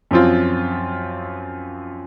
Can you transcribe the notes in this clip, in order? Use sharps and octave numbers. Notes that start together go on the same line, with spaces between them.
F#2 F3 C4 F4